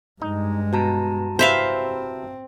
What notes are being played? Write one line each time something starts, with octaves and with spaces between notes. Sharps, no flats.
G2 G#3 D#4
B2 F#4 A5 A#5
C3 C4 E4 B4 C5 E5 F5